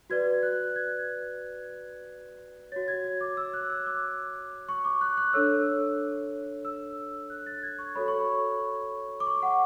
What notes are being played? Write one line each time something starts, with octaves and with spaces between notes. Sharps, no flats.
F#4 B4 D5 G#6
F#6
G#6
F#4 C#5 A6
G#6
G#6
D6
E6
F#6
E6
D6
C#6
D6
F#6
F#6
D4 A4 C#5 E6
E6
F#6
A6
G#6
C#6
F#4 A4 C#5 B5
C#6
B5
D6
C#6
F#5